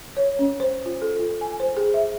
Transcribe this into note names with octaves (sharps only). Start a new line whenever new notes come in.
C#5
C#4
C5
F4
A4
F4
G#5
C5
G#4
E5